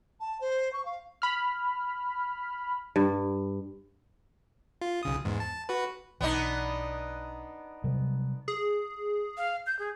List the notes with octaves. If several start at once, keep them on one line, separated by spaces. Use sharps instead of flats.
A5
C5
C#6
F5
B5 F6
G2
F4
B1 C#3 D#6
E2 G#2
A5
F#4 B4
B1 E3 B3 D4 D#4
C3 F#3 G3
G#4
F5
G6
G#4